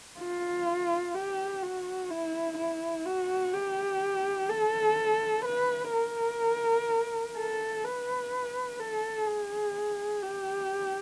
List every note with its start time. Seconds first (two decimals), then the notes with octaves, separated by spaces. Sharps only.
0.19 F4
1.15 G4
1.62 F#4
2.11 E4
2.58 E4
3.06 F#4
3.54 G4
4.49 A4
5.45 B4
5.93 A#4
7.37 A4
7.84 B4
8.79 A4
9.27 G#4
10.23 G4